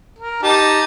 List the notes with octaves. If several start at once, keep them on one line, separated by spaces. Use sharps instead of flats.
A#4
D#4 G4 A5